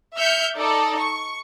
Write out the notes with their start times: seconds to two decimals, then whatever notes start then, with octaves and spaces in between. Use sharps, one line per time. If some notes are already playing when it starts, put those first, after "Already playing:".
0.15 E5 F6 G6 C#7
0.56 D#4 A4 D5
0.99 C#6